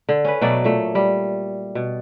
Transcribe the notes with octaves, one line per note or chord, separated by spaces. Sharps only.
D3
C#4 B4
B2 F#3 A3 D5
A#2 A3
G3
B2